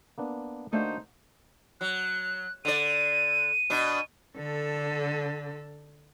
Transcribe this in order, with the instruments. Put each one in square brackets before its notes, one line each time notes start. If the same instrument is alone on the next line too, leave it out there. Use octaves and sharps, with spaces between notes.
[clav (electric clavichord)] A#3 B3 D4
[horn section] D3 D#4 C5 [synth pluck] A3 [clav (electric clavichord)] A#3 D4 F#4
[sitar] F#3 [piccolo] F#6
[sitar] D3 D5 [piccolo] D#7
[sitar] B2 D4
[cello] D3 A4